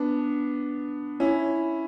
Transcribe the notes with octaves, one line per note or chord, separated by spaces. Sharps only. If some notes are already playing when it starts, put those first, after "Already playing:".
Already playing: B3 D4
C#4 E4